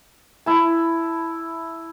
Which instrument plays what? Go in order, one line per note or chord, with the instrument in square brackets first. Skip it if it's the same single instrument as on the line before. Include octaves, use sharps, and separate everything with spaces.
[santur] E4 A5